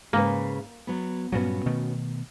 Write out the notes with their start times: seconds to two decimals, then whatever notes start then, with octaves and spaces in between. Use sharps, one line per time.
0.13 G#2 C#3 A#3 B4
0.87 F#3 B3
1.32 G2 A#2 F#3 B3 C#4 F#4
1.66 B2 D#3 A3